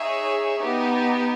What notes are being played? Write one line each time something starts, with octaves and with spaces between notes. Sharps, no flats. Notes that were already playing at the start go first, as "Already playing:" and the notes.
Already playing: D#4 G#4 C#5 E5
B3 D#4 G4